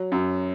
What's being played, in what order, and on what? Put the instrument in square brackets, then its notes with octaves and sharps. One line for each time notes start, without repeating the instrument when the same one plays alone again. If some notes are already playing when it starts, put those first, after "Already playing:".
Already playing: [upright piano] F#3
F#2